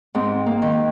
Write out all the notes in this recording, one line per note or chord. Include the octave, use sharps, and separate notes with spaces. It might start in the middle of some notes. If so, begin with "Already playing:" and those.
G#2 C4
A#3
D#3